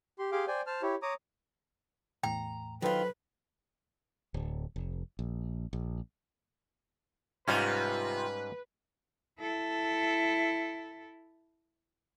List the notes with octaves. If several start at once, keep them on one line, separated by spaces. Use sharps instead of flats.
G4 C6
G4 G#4 F5 C6 D6
C5 D5 G5 G#5
C5 A5 F6
E4 G4 C#5
C#5 A#5 D6 D#6
E2 A2 G5 A#5
D#3 F#3 F4 A4 B4 C5
D1
F1
A#1
A#1
G#2 C3 G3 C#4 F4 B4
E4 A4